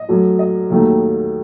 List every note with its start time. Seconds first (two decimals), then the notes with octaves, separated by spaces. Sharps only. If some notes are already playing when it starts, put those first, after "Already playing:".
Already playing: D#5
0.09 F#2 F#3 A3
0.39 D#5
0.70 D#2 D#3 F#3 A3